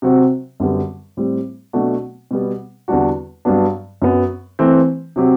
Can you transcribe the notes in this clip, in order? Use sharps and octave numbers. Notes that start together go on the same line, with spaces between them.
C3 F#3 C4 F#4
F#2 D3 G3 B3
A2 G3 C4
B2 F#3 A3 D4 F#4
B2 G3 B3
E2 D3 G3 D4 F#4
G2 F#3 B3 D4
F#2 F#3 B3
E3 A3 C4
C3 F#3 C4 G4